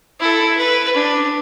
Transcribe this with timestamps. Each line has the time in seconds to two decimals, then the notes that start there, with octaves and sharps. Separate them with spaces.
0.20 E4 A4
0.57 B4
0.94 D4